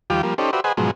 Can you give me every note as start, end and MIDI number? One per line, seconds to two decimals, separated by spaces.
0.10 0.22 39
0.10 0.22 53
0.10 0.22 55
0.10 0.22 65
0.10 0.22 79
0.10 0.22 86
0.23 0.34 53
0.23 0.34 55
0.23 0.34 58
0.38 0.51 61
0.38 0.51 63
0.38 0.51 67
0.38 0.51 69
0.38 0.51 72
0.38 0.51 74
0.53 0.60 66
0.53 0.60 67
0.53 0.60 71
0.53 0.60 72
0.53 0.60 74
0.53 0.60 76
0.64 0.72 68
0.64 0.72 71
0.64 0.72 72
0.64 0.72 75
0.64 0.72 78
0.64 0.72 80
0.77 0.91 44
0.77 0.91 47
0.77 0.91 53
0.77 0.91 54
0.77 0.91 56